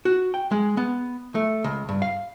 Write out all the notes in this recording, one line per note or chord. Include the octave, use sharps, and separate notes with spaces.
F#4
G5
G#3
B3
A3
C#2
G2
F5